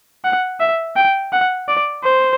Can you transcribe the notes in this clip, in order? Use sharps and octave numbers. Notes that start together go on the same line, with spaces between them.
F#5
E5
G5
F#5
D5
C5